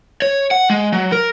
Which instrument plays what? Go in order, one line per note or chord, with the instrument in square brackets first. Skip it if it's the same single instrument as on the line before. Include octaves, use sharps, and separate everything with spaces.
[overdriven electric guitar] C#5
F#5
G#3
F#3
A#4